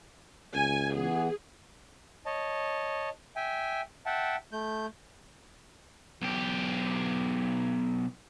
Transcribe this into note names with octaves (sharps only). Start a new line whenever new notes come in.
C#2 G#5
E3 B3 G#4
C#5 D#5 A5
E5 G5 G#5
E5 F#5 G5 A5
A3 G6
B1 G4